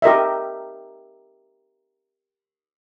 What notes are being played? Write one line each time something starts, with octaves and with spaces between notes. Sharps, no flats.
G4 A#4 D#5 E5